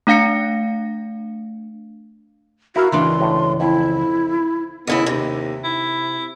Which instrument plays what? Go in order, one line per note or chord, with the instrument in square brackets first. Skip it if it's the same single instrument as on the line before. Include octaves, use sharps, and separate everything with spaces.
[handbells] A3 D4 F5 A#6 C#7
[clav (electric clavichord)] E4 A#4 F5 [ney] F#4
[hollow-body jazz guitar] C#2 E3 D4 [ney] C6
[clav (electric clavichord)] A2
[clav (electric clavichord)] F2 [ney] E4
[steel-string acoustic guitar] D#2 C#3 E4 [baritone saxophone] B3
[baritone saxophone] D#2 [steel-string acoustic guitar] C3
[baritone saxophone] E4